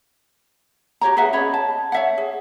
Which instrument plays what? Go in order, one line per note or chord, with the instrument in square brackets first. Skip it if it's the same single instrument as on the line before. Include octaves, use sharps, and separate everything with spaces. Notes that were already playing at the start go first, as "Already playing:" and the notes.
[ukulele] F#4 G4 C#5 A#5
G#4 B4 E5 F#5
C#4 C#5 D#5 B5
A5
C#5 E5 F#5
G#4